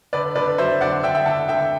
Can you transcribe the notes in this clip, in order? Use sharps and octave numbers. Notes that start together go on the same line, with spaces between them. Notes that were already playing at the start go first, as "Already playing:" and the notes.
D3 B4 D5
D3 B4 D5
F#3 C5 E5
D3 D5 F#5
D3 E5 G5
E5 G5
D3 F#5 A5
D3 E5 G5